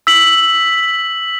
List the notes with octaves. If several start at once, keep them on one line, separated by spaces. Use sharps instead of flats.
E6 B6 F#7